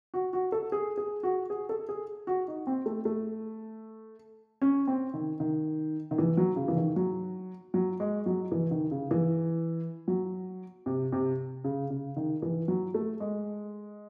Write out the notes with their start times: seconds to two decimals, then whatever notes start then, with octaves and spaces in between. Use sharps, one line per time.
0.14 F#4
0.33 F#4
0.52 A4
0.72 G#4
0.97 G#4
1.23 F#4
1.50 G#4
1.69 A4
1.89 G#4
2.27 F#4
2.48 D#4
2.67 C4
2.86 A3
3.05 A3
4.62 C#4
4.87 C4
5.14 D#3
5.40 D#3
6.11 D#3
6.18 E3
6.37 F#3
6.56 C#3
6.68 E3
6.77 D#3
6.96 F#3
7.74 F#3
8.00 G#3
8.26 F#3
8.52 E3
8.71 D#3
8.91 C#3
9.11 E3
10.08 F#3
10.86 C3
11.12 C3
11.64 C#3
11.90 C#3
12.16 D#3
12.42 E3
12.68 F#3
12.94 A3
13.20 G#3